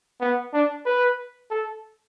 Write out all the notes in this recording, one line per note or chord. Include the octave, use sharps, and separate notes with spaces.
B3
D4
B4
A4